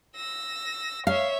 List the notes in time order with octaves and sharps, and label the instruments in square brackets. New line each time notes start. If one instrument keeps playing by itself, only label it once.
[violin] E6 A#6
[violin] C#5 E5 [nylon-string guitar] F5